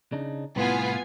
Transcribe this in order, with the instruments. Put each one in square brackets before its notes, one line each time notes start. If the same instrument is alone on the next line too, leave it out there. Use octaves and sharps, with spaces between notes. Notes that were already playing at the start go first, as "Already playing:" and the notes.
[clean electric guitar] C#3 D4 D#4
[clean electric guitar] C2 A2 [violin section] B3 F4 G#5